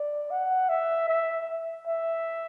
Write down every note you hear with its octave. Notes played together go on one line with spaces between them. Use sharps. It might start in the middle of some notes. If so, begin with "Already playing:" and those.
Already playing: D5
F#5
E5
E5
E5